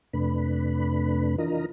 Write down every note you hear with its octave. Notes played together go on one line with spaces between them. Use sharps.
F2 C3 A3 D4 B4 B5
E3 D4 F4 A#4 D#5 A#5